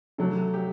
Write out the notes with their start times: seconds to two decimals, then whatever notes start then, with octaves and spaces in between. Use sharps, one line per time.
0.18 C3 F#3 A3 A4
0.54 G4